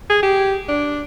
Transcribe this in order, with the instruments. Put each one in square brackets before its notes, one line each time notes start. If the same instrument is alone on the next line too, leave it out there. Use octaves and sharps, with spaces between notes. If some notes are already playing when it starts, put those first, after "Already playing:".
[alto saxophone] G#4
G4
D4